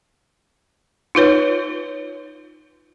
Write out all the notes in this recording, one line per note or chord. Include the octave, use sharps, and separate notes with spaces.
D#4 F4 B4 C#5